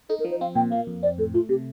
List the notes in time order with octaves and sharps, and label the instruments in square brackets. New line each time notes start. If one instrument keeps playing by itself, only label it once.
[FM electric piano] D#4 [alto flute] A4
[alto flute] A#4
[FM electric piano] F3
[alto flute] C5
[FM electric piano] C4 [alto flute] F5
[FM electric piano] A#2 [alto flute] G5
[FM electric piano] A#3 [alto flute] F5
[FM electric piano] F2
[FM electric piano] C4 [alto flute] D5
[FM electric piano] A2 [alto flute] A4
[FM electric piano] A3 [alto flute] F4
[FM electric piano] C3 [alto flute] G4